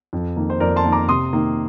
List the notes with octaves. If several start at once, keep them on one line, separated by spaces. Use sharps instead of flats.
F2
D#3 A#3
C5
F2 A#4 D5
A5 C6
D#3 A#3
A#5 D6
C3 C6 D#6
D#3 A#3